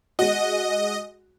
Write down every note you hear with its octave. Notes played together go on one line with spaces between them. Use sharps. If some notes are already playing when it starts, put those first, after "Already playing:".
G#3 F#4 D#5